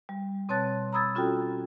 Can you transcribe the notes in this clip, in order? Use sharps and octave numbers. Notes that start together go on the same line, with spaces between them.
G3
B2 C4 C#5 A5 F#6 A6
A#5 B5 D#6 E6 G#6 A6
C#4 F4 F#4 A4 G5